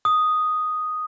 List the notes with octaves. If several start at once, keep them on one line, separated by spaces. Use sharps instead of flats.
D#6